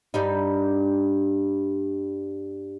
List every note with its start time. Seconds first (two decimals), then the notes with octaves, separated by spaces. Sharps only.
0.14 G2 G3 D#4